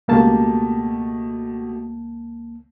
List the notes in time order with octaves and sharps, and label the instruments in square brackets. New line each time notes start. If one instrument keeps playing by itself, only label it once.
[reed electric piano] C#2 A#3 A5 [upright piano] B2 A3 G4